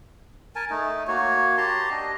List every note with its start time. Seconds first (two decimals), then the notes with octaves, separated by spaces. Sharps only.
0.55 A#4 G#5 A5
0.70 A3 D#4
1.08 A#3 F#4 C#5
1.58 G4 A5 A#5 C6
1.91 D4 D#5